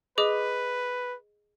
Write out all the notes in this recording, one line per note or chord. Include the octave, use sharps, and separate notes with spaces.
G#4 B4 D#5 D6